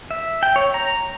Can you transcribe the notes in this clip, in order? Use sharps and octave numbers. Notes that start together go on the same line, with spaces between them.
E5
G5
C#5
A#5